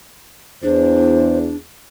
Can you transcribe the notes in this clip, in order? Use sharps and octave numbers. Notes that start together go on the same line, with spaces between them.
E2 D4 C5